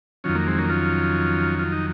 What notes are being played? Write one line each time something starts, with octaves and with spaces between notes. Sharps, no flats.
F2 D#3 F#3 C#4 F4
A#3
G#3 C4
A#3 C#4
C#4 F4
F4
D#4